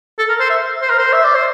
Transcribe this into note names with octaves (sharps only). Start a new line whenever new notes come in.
A4
A#4
C5
E5
C5
A#4
C5
E5
D5
C5